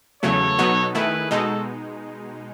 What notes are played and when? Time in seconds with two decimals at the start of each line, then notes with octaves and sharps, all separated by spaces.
0.23 E2 C#3 F#3 A3 A4 C#5
0.59 B2 F#3 B3 D#4 F#4
0.94 D#3 A3 E4 G#4 B4
1.31 B2 G#3 D#4 F#4 A4